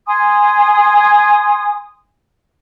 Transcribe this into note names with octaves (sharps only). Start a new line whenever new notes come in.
G#5 C6 D#6